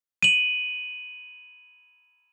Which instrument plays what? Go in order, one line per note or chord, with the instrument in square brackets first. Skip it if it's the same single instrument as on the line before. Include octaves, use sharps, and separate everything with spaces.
[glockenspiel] D#7 F#7